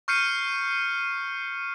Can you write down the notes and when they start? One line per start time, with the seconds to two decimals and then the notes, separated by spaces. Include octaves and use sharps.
0.08 C#6 F6 G6 C7 C#7 D#7